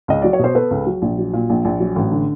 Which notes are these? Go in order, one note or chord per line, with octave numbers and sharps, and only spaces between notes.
C#2 D#5
F#3 D5
C#5
B2 C5
B3 A4 B4
C#2
F#3
A#1
F#3
A#2
A#1
A#1
F#3
A1
D3